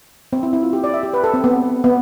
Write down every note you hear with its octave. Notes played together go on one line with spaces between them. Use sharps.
C4
E4
E4
F4
G4
D5
E5
G4
B4
A4
C4
B3
B3